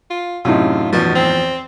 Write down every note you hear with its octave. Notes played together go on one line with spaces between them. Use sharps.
F4
F#2 A2 C3 D#4 F4
E2 B2 F3
C4